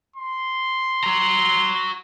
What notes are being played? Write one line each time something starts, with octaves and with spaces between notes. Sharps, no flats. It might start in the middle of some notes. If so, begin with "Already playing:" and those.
C6
F#4 A#5